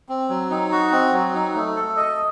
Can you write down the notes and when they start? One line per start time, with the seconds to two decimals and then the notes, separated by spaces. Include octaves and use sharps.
0.09 C4
0.29 F#3
0.50 D#4
0.72 F#4
0.92 C4
1.13 F#3
1.34 D#4
1.55 A3
1.76 A4
1.97 D#5